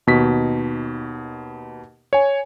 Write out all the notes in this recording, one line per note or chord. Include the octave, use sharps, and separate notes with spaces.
D#2 B2 D#4 C#6 B6
C#5 G#5